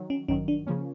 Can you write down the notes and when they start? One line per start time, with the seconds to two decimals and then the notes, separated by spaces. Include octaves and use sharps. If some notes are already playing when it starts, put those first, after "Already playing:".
Already playing: D#3 F#3
0.10 C#4
0.28 A1 G2 D#3 F#3 C#4
0.48 D4
0.67 C#3 F3 A#3 C#4